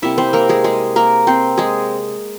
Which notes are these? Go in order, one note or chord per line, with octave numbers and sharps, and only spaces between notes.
C3 G3 A#3 E4 E5
C4 C5
A#3 A#4
G#3 G#4
G#3 G#4
A#3 A#4
C4 C5
G#3 G#4